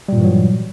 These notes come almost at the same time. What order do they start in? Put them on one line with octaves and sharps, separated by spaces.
G3 A#2 G2 E3 F#3